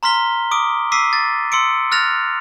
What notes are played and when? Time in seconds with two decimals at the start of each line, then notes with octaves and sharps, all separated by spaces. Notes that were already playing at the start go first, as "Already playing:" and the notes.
0.03 A#5 C6 F6 B6 G7
0.51 D6 D#6 D7
0.92 D6 E6 B6 C7 D#7
1.13 A6
1.52 C6 E6 C#7 D7
1.92 F6 F#6 A6 A#6 F7